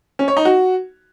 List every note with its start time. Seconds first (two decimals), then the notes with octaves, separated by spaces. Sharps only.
0.19 C#4
0.28 C#5
0.37 D#4
0.45 F#4